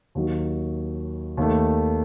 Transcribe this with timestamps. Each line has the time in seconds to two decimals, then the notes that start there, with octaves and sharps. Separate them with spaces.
0.15 D#2 D#3 F#3
1.37 D#2 D#3 A3